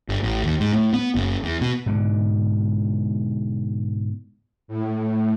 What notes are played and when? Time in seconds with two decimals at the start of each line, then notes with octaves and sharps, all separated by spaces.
0.09 G1
0.23 A1
0.43 D#2
0.60 G#2
0.74 A2
0.94 B3
1.15 F#1
1.44 E2
1.61 B2
1.86 G#2 B2 D3
4.68 A2